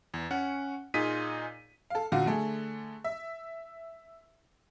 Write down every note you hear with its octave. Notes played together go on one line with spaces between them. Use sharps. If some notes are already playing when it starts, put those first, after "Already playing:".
E2
C#4 F#5
A#2 D#4 F4 G#4 B6 D#7
A4 F5
A#2 D3 F#4 F5
D3 A3 G#4
E5